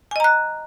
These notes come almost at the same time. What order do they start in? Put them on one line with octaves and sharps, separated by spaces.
G#5 D#5 A#5 F#6